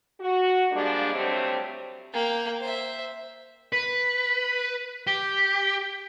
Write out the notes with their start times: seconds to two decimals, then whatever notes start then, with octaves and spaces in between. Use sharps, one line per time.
0.20 F#4
0.72 F3 G3 G#3 A#3 D4
1.14 D3 F#3 G3 A3 C4
2.14 A#3 G5
2.60 C5 E5
3.73 B4
5.07 G4